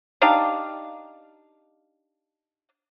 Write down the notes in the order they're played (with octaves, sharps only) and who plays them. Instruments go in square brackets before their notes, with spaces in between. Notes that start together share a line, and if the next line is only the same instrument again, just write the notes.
[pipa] D4 D#4 G4 F5